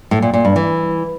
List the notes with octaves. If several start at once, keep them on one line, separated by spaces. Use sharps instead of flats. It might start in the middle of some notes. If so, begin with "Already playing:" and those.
A2
A#2
A#2
G2
E3